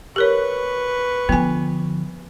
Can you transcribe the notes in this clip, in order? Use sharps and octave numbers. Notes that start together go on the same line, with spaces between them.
G4 A#4 B4 C#5 C#6
D3 F3 B3 G#5